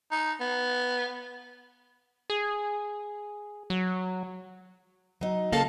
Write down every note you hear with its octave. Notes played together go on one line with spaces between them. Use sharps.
D#4
B3
G#4
F#3
F#3 D#4
C#3 A#3 A4 F5 A5